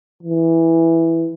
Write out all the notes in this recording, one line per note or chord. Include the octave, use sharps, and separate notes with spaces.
E3